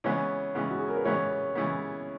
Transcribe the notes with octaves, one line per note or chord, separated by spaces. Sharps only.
C#3 E3 G#3 B3 C#5
C#3 E3 G#3 B3
F#4
G#4
A#4
B4
C#3 E3 G#3 B3 C#5
C#3 E3 G#3 B3